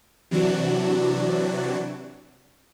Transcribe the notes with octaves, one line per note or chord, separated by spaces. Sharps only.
C3 E3 F#3 D4 F#4